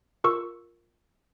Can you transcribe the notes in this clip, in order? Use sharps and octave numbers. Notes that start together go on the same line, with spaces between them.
F4 A#4 C#6 E6